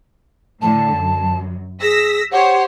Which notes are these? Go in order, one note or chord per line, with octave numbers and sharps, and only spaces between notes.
A2 D3 A5
F#2
G#4 E6 A#6 B6
G4 C5 C#5 F#5